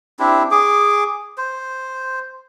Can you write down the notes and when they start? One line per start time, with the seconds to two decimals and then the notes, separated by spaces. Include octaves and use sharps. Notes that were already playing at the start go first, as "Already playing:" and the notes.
0.19 C4 D4 E4 G4
0.51 G#4 D6
1.38 C5